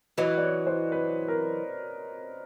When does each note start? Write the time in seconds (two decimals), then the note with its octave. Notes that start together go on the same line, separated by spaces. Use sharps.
0.18 E3 F#3 D#5
0.38 D5
0.43 C#5
0.67 C5
0.92 B4
1.28 A#4